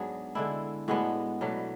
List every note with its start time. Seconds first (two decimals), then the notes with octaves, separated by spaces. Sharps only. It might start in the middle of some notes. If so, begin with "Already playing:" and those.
Already playing: G#2 F#3 B3 D4 G#4
0.35 D3 G#3 D4 E4
0.88 A2 G#3 B3 D4 F#4
1.41 B2 F#3 A3 D4